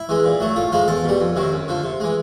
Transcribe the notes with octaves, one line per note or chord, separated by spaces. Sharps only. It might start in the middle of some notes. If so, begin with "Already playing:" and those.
Already playing: E4
E3 G#3
A#2
F#3 A3
A2 F4
F3 G#3 F4
E2 A4
B2 G3
F2
C3 D#3 F#3
F#2
D3 F3
C3
E3 G#3